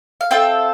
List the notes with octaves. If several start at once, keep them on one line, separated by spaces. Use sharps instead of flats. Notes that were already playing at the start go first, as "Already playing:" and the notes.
F5
C4 F4 A4 E5 G5